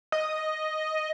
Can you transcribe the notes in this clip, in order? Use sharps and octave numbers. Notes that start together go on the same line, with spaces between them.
D#5